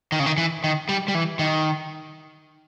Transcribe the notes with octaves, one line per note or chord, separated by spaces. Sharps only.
D#3
C#3
D#3
E3
D#3
G3
G3
E3
D#3